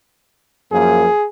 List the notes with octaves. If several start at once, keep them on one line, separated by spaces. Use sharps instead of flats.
F#2 F3 A#3 G#4